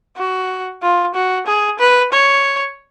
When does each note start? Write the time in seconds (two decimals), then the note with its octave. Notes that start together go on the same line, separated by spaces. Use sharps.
0.17 F#4
0.82 F4
1.15 F#4
1.46 G#4
1.79 B4
2.13 C#5